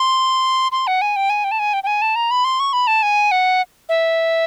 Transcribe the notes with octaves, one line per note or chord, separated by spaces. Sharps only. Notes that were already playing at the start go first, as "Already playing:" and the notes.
Already playing: C6
C6
F#5
G#5
G5
G#5
G5
A5
G#5
G5
G5
G#5
A5
A#5
B5
C6
C#6
B5
A5
G#5
F#5
E5